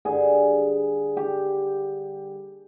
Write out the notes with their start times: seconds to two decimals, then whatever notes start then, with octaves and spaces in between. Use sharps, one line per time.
0.05 G2 D3 G3 G#4
1.17 G4